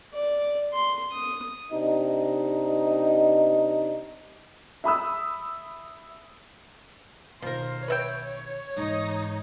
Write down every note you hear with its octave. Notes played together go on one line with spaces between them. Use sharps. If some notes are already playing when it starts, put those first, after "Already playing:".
D5
C6
D#6
C3 D4 D#4
E5 B5 D#6 E6
B1 D#3 F3 A#4 C5
B4 C#5 E5 G5
G#2 E3 D#4